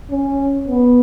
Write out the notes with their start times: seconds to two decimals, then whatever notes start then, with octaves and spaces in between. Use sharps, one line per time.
0.11 C#4
0.68 B3